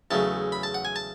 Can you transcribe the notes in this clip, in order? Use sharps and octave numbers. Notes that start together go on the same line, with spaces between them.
E2 C#3 F#3 A3 A5
B5
A5
F#5
G#5
A5